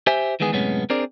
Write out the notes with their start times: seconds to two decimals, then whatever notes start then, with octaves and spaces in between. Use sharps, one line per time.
0.07 G4 C5 E5 G#5
0.40 D#3 E3 G#3 B3 G#4
0.52 F#2 A2 C3 G#3 B3 C#4
0.90 C4 D4 G#4 A#4 C5 D5